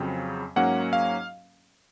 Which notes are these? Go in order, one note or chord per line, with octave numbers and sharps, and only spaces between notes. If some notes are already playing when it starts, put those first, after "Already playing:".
Already playing: F2 C#3 F#3 C4
G#2 F#3 A#3 C#4 F#5
F5